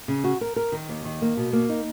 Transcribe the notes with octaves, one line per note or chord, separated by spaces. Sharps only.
C#3
F#4
A#4
A#4
D#3
D#2
D#3
A#3
B2
A#3
D#4